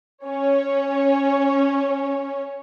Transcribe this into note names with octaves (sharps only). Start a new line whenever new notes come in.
C#4 C#5